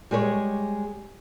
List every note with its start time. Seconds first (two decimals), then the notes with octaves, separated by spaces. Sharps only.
0.11 G3 G#3 G#4 B4 C#5